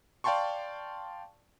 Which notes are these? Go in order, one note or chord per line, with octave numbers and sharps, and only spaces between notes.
D5 F5 G5 A5 C6 C#6